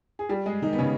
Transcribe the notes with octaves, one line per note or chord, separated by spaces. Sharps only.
G#4
G3 G4
G#3 G#4
D#3 D#4
B3
C#3 C#4